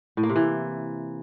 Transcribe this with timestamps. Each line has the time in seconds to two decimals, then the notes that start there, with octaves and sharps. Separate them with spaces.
0.17 A2
0.23 A#3
0.29 C3
0.36 E3